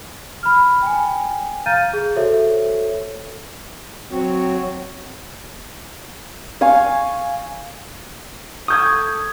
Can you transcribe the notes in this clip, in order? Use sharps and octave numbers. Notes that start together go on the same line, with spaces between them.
B5 F6
G5 G#5
F5 A#5 F6 G6 A6 D#7
G#4
F#4 A4 C5 C#5 E5
F#3 C4 F#4 C#5
F5 G#5 C#6
A4 C#6 D#6 G6 G#6